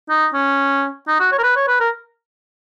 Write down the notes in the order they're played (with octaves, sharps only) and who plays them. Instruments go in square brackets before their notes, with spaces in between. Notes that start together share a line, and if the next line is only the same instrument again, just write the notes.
[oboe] D#4
C#4
D#4
F#4
C#5
A#4
B4
C#5
B4
A#4